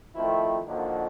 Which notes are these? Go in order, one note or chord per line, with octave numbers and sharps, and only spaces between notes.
D#3 F3 A3 C4 E4
D3 D#3 F3 F#3 A#3